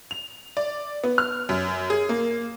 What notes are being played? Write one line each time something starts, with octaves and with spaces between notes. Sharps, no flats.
F7
D5
B3
F6
F#2
G#4
A#3